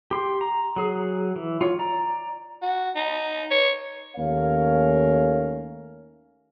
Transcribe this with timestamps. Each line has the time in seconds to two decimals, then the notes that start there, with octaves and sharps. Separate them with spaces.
0.11 G4 C6
0.41 A#5
0.76 F#3 G#4
1.36 E3
1.61 F4 C#5
1.79 D5 A#5
2.62 F#4
2.95 D#4
3.51 C#5
4.17 D#2 A3 C#4 A#4 C#5 F5